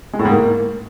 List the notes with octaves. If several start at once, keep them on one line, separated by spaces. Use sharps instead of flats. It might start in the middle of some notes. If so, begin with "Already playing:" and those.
G#3
A2
G#2
A#3